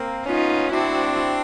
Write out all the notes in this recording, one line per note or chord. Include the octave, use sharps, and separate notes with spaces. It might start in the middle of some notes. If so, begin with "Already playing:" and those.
Already playing: A#3 C4
B3 C#4 D#4 F4
C4 D4 E4 F#4